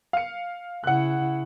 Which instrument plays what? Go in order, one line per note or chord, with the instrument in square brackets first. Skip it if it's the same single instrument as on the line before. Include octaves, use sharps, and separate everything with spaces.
[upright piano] F5 C#7
[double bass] C#3 E4 [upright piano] F#5 F#6